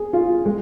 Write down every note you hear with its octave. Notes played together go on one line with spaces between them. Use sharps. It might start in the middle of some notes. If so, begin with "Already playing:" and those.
Already playing: G#4
F4
G#3